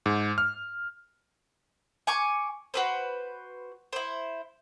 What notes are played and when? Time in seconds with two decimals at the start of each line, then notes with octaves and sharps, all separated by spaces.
0.06 G#2
0.38 F6
2.07 G#5 C#6 D6
2.74 F#4 B4 C5
3.93 E4 C5